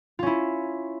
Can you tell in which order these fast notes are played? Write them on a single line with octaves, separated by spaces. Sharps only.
F4 C#4 E4